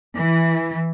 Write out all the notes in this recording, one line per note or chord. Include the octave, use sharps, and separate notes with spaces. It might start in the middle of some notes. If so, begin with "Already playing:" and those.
E3